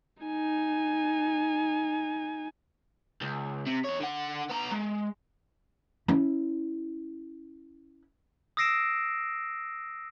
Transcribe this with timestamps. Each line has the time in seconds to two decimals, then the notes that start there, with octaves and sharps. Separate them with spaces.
0.23 D#4 G#5
3.21 C#2
3.66 C3
3.84 E2 C#5
4.00 D3 F#5
4.50 B3 A#5
4.72 G#3
6.08 C#4 E4
8.57 D#6 E6 A#6 C7 D7 E7